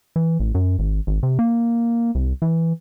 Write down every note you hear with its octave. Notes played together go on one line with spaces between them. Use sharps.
E3
A1
F#2
G#1
G#1
C3
A#3
C2
E3